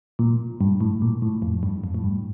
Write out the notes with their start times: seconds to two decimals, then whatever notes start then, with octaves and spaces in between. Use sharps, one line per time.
0.19 A#2
0.61 G2
0.81 A2
1.02 A#2
1.22 A2
1.42 F2
1.63 G2
1.84 F2
1.94 A2
2.04 G2